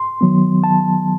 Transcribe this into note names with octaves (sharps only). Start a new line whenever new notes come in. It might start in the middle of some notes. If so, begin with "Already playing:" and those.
Already playing: C6
D#3 F#3 B3
A5